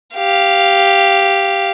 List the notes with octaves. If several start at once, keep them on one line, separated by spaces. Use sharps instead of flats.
G4 F5